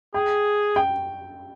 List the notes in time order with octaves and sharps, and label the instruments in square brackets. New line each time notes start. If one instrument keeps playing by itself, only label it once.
[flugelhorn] G#4 [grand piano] G5
[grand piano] G5